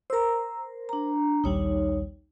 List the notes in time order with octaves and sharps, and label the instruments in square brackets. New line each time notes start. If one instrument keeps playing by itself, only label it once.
[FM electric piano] A#4 C5 [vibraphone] A#5 E6
[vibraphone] D4 A#5
[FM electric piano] A#1 D#2 G3 [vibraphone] D#4 C#5